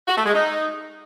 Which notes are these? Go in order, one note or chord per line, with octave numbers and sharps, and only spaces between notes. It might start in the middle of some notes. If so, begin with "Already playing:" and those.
F#4
A3
G#3
D#4